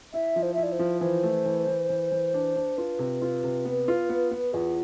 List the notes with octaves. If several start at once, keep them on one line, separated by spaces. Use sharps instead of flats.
E4 E5
F3
C5
E4 E5
D5
C5
F3
E3 C5
A3
E3
E3
E3
E3
D4
D4
F4 B4
C3
F4
C3
B3
F4
B3
B3
E2 F4